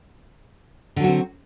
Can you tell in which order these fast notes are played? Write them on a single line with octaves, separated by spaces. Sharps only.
D3 F#3 F#4 C4